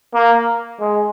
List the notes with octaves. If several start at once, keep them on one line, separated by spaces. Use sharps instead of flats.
A#3
G#3